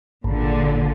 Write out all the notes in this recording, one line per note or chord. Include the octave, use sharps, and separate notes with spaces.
G#1 A#2 D3